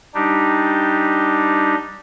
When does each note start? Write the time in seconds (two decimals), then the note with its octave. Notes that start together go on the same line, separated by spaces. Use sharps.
0.14 G3 D4 D#4 G4